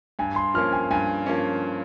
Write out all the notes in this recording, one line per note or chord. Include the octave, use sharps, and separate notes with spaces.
G2 G#5
C6
F3 A#3 C#4 F6
G#5
G2 G#5
F3 A#3 C#4